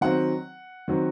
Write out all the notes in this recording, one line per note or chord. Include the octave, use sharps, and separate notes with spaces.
D#3 F#3 C4 F#5
D#3 F#3 C4